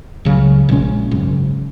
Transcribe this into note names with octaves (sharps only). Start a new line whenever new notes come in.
C#2 C#3 F#3
A#1 A#2 G#3 C#4
G#1 F#2 C#3